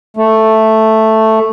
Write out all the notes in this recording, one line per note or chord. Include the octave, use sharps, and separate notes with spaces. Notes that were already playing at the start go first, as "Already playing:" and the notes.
A3